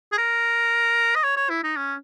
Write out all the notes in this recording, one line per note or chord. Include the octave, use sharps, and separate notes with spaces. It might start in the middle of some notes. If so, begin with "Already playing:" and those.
G#4
A#4
D#5
C#5
C#5
E4
D#4
C#4